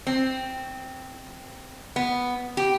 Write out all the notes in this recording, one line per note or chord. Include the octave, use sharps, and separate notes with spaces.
C4
B3
G4